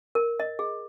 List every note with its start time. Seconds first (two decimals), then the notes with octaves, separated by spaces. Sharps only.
0.15 A#4
0.40 D#5
0.59 G#4